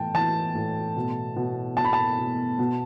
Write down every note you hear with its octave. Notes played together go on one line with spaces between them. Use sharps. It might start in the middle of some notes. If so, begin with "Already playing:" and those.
Already playing: A2 E3 G5 A5
E3 A5
A2
B2
B2
B2 A5
B5
A5
B2
B2